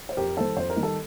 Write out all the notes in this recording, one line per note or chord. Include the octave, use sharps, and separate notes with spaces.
C5
F2 G4 A#4
D#3 G3 A4 C5
F2 C5
A#4
D#3 G3
A4